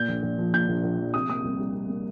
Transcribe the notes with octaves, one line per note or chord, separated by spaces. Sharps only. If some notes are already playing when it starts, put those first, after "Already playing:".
Already playing: A#2 G6
A#1
A#1
F3
A#2 G6
A#1
A#1
F3
C3 D#6
A#3 D#6
C2
G3
C3
A#3